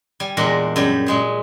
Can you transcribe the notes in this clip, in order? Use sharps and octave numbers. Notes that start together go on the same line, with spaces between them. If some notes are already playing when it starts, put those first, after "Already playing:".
G3 G#5
E2 A#2 G#3 D4 A#4 C6
F#2 G3 G4
A#2 G#3 G#4